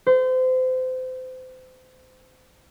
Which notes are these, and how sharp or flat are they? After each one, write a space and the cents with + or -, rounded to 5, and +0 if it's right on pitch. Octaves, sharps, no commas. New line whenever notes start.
C5 -30